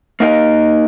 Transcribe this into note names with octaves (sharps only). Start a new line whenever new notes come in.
A#3 D#4 A#4 D#5